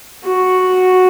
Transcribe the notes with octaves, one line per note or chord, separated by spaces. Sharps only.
F#4